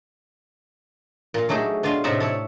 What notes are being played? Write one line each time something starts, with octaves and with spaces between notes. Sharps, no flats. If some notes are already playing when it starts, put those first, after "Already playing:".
A#2 F5
F#3 A3 D#4 G4 G#4
B2 D4 F4 F5 G#5 C6
A2 C3 D#4 D5 E5 F#5
A4 C#5 D5